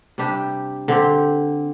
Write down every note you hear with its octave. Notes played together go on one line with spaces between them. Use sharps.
C3 G3 D4 G4
D3 C4 G4